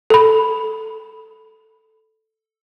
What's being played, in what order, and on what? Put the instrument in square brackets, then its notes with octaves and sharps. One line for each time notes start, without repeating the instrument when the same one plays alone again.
[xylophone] A4 B5